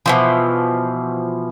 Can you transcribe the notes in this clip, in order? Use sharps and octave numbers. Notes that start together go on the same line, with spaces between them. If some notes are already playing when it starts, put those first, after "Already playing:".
B2 E3 F3